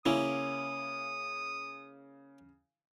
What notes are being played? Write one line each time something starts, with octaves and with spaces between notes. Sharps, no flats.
C#3 A#3 C#4 E4 D#6